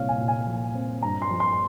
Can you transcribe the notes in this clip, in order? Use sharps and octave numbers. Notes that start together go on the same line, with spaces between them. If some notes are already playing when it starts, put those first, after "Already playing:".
Already playing: C2 A#2 C4 C#5 F5
G#5
A#2
G#5
F3
C4
G2 A#5
C6
F3
C6